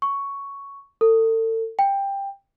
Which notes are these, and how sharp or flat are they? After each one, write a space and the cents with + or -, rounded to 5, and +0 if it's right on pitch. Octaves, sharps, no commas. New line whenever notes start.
C#6 +5
A4 +35
G5 +15